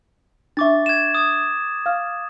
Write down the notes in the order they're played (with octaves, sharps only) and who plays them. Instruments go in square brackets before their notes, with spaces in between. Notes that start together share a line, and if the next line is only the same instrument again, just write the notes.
[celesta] D4 E5 [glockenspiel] C#6 D6 A6
[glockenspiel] G#6 E7
D#6 G#6
[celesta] F5 F6